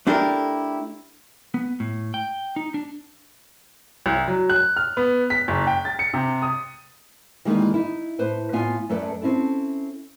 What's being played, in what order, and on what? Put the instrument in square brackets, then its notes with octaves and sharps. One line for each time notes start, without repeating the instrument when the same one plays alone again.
[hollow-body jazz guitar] A3 D4 E4 G4 A4 A#4
[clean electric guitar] B3
A2
G5
D#4
D4
[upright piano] C2
F#3
F#6
F6
B3
B6
F#1
G5
A6
C#7
C3
D#6
[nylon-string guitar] D#3 E3 G3 G#3 A#3 D#4
D#4 E4
A2 B4 C5
A2 B3 F4 F5 G#5
F#2 A3 A4 B4 D5
C4 C#4 E4 A4